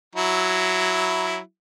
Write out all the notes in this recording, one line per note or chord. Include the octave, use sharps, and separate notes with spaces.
F#3 E4